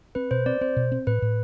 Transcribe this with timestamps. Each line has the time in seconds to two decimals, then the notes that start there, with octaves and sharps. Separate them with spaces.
0.15 C4 B4
0.31 B2 C5
0.46 C4 D5
0.61 C4 C5
0.77 B2
0.92 C4
1.07 A2 B4
1.22 A2